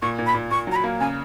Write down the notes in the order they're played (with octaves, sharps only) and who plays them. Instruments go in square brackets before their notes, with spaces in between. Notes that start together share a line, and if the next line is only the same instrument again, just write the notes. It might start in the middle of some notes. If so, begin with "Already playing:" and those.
[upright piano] A#2 [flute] C#6
[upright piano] A#2
[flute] B5
[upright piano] A#2
[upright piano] A#2 [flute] C#6
[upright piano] F#3 [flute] A#5
[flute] B5
[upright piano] A#3
[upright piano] C#3 [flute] G#5